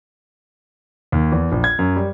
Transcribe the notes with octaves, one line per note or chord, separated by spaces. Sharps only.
D#2
E2
A#1
G#6
F#2
G3